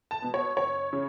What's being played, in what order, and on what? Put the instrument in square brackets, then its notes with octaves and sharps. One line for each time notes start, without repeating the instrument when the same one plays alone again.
[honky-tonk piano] A5
B2 B3
C#5
F#1 C#5
C#3